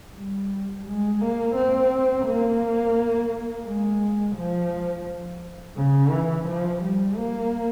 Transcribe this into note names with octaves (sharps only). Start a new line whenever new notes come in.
G3
G#3
A#3
C4
A#3
G#3
F3
C#3
E3
F3
G3
A#3